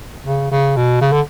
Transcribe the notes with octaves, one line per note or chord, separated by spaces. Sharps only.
C#3
C#3
B2
C#3
D3